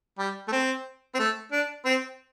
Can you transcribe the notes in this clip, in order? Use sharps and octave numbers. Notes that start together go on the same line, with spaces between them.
G3
A3
C4
C4
A3
D4
C4